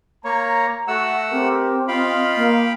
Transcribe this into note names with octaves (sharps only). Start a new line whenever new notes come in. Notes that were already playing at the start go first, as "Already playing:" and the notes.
A#3 C#5 A#5
A3 F#4 F#5 E6
C4 G4 A#4
F4 D#5 F5 G5 B5
A#3